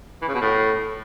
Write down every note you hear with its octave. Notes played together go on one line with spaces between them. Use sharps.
E3
C#3
B2
A2